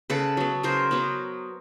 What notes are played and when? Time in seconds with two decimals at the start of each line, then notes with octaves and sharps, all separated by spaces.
0.10 C#3 A4 B4
0.37 F#3 B3
0.63 C#3 A#4 C5
0.91 F#3 B3